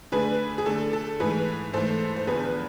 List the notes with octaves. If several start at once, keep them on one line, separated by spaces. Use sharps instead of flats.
D3 A3 D4 G#4 B4
G#4
D3 A3 D4 A4
A4
G#2 E3 A3 G#4 B4
G#2 E3 A3 A4 C5
C5
E2 D3 F3 G#4 B4